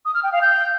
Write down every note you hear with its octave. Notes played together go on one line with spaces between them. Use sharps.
D#6
F6
G5
F5
G6